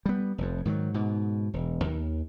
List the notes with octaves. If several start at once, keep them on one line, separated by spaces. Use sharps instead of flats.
G3 B3
F1 F2
G#2 D#3 F3 F#3
G#2 B2
E1
D#2